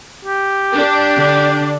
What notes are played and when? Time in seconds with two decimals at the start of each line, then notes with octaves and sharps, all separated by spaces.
0.25 G4
0.75 D4
1.15 D3